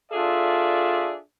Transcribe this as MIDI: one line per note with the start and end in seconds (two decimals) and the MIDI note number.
0.12 1.17 62
0.12 1.17 65
0.12 1.17 68
0.12 1.17 69
0.12 1.17 74
0.12 1.17 76